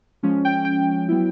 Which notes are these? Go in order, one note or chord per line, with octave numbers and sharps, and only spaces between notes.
F3 G#3 C#4
G5
G5
F#3 B3 E4